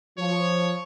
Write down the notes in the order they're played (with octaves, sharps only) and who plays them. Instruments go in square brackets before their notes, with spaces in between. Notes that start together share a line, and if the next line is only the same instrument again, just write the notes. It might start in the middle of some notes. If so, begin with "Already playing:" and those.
[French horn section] F3 [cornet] C#5